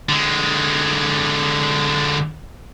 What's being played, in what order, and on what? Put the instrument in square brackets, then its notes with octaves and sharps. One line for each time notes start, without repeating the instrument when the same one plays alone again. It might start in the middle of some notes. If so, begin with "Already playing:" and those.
[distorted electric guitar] D3 G#3